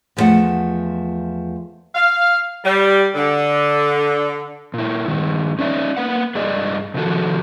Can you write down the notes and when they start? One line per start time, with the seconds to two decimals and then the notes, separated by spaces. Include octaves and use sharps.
0.17 E2 B2 F3 A3 F#5
1.95 F5
2.64 G3
3.14 D3
4.74 A#2 E4
5.08 G2 D#3
5.59 C#4 D#4 D5 E5
5.97 A#3 B4 F#5
6.35 G2 G#4 D5 D#5
6.94 C3 D#3 F3 F#4 A4